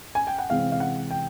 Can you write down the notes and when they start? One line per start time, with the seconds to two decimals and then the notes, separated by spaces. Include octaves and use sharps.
0.15 G#5
0.27 G5
0.39 F#5
0.50 C3 E3 G#3 C4 F5
0.72 F5
0.80 F#5
1.11 G5